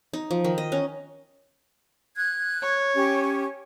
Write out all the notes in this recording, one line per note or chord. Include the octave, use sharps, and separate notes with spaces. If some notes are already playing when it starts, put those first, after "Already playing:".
D#4
F3
D#3
D#5
C#4
F#6 G#6
C#5
C#4 G4